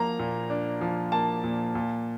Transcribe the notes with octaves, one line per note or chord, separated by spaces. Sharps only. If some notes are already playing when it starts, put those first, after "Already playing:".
Already playing: F3 A#3 A#5
A#2
D4
F3
A#3 A5
A#2
A#2